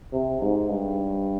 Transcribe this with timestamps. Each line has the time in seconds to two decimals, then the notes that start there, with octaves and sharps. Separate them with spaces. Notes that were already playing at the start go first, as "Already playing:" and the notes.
0.13 C3
0.41 G#2
0.69 G2